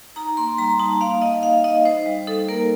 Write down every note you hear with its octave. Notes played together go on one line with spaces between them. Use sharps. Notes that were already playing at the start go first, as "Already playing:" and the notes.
D#4 A#5
A#3 C6
G3 A#5
D#4 A5
A#3 F5
D#4 D#5
D#4 F5
D#4 D#5
D#4 C5
G3
D#4 A4
A#3 A#4